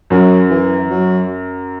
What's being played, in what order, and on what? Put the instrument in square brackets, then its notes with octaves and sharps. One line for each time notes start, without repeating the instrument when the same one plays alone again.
[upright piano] F#2 [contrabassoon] F#3
[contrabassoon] E3
F#3